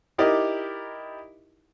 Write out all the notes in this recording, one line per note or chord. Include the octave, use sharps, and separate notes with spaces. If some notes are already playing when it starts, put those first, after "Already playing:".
D#4 E4 G4 A#4 D5 D#5